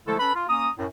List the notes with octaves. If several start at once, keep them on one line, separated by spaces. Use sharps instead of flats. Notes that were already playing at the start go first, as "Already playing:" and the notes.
D3 F3 G#3 A3 E4 A4
C#4 A4 B4 B5
F4
A#3 C#4 A#5 D#6
F#2 A2